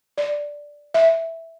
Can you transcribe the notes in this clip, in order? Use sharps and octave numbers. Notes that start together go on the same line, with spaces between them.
D5
E5